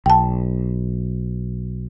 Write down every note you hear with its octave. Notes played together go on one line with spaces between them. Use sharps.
B1 G5 A5